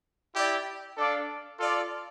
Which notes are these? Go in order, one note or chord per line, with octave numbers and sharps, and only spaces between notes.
E4 G4 D5
D4 A4 D5 F5
F4 A4 D5